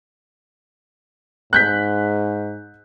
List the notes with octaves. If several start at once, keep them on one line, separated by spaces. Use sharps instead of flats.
G#2 F#6 G6 B6